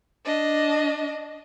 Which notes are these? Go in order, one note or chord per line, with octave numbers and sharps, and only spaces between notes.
D4 D#5